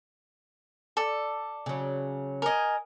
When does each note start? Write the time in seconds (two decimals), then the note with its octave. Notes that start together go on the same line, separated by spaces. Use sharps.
0.97 A4 D5
1.66 C#3 F#3
2.42 A#4 D#5 G#5